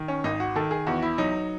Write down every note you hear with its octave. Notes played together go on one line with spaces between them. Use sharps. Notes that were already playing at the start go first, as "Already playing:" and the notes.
Already playing: D#3
C#4
G#1 D#4
F#4
D#3 A4
G#4
E2 F#4
E4
F#3 D#4